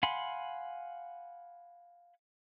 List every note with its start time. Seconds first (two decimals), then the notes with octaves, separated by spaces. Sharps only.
0.03 F5 F#5 G#5 B5 C6